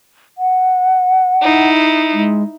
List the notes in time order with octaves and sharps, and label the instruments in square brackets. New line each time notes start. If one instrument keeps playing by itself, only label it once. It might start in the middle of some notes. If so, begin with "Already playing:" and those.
[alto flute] F#5
[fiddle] D#4 E4
[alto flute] G#3